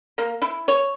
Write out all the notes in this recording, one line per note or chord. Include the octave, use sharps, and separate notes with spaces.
A#3
E4
C#5